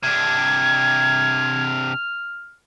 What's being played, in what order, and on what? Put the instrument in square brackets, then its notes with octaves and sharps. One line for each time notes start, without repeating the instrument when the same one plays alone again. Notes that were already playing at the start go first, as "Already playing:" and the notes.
[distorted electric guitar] C3 D4 [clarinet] F6 [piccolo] G#6